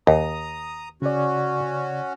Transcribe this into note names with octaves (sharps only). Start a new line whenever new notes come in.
D#2 A#5 D#6
C#3 C#4 F#4 D5